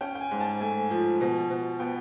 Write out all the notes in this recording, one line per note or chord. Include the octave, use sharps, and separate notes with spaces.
C#4 G5
G5
G#5
G#2
A5
A3 G#5
F3
B2
B2
B3 G5